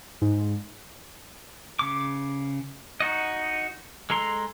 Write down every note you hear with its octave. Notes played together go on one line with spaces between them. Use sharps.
G#2
C#3 D6
D#4 F#4 D#5
G#3 A4 A#5 C6